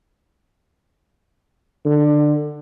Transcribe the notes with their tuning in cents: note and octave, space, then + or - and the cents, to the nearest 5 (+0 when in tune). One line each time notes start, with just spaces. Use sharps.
D3 +20